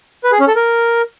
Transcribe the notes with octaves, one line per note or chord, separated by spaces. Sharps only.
B4
G#4
C#4
A4
A#4